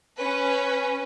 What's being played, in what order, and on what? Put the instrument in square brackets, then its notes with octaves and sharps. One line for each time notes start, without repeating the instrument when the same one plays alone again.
[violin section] C#4 B4